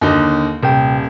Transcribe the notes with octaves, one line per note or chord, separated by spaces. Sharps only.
D#2 D3 D#4
D#1 C3 G5